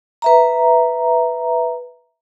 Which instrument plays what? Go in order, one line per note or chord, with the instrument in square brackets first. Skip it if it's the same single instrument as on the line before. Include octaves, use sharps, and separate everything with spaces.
[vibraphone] B4 E5 A#5